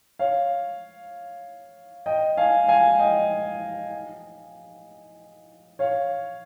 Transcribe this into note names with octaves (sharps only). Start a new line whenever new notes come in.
C#5 F5
D#5 G5
F5 G#5
F5 G#5
D#5 G5
C#5 F5